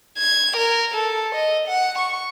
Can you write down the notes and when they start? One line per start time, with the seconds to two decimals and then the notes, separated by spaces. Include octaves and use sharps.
0.18 G#6
0.57 A#4
0.94 A4
1.35 D#5
1.68 F#5
1.98 C#6